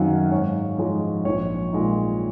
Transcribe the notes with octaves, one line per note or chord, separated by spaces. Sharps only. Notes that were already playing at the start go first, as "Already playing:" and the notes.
Already playing: F#2 D#3 F#3 C4 D#4 F5 F#5 G#5
G#2 C#5
F3 G#3 D#4 C#5
A#1 C#5
A#2 G#3 D#4